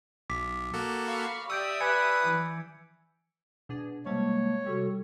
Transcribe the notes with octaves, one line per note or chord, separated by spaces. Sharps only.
B1 D6 B6
A#3 F#4 A4
F5 B5 C#6
G4 D5 E5 D#6 E6 G6 D7
B4 G#5 G#6 C#7
E3
B2 D4 G#4
C3 G3 G#3 A#3 C#5 A5
C3 G3 F#4 A4